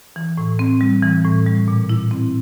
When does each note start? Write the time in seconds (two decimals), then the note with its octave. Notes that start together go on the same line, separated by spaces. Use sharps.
0.16 E3
0.38 A2
0.59 C4
0.81 G3
1.03 E3
1.25 A2
1.46 G3
1.68 A#2
1.89 E4
2.11 C4